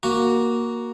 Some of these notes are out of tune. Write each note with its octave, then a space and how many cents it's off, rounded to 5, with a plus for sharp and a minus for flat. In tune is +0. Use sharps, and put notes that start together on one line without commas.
A#3 +5 F#4 +0